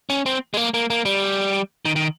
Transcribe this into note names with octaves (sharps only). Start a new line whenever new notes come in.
C#4
C4
G#3
A#3
A#3
A#3
G3
D#3
D#3